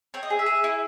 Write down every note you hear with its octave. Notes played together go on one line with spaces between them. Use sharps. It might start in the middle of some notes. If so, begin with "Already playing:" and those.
C4 C#5
D#5
G#4
E5
G#4
E4